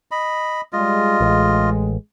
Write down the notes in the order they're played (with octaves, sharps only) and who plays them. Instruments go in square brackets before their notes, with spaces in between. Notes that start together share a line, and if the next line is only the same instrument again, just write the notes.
[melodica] D#5 B5
[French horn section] G3 G#3 [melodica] F4 D#5
[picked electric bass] A1 [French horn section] G#3